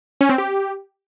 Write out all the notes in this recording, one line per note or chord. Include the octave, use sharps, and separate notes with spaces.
C#4
C4
G4